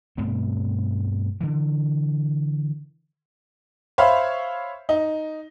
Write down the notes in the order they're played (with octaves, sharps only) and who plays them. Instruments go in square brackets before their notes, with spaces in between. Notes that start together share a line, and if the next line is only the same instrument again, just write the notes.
[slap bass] G2 B2 A3 C4
D3 E3
[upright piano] C5 C#5 E5 F5 B5
D#4